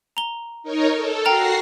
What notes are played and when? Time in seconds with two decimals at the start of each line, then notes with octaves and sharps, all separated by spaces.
0.17 A#5 G7
0.63 D#4 A#4 C#5
0.94 A4
1.25 F#4 G5 A#5 F6 A#6 C7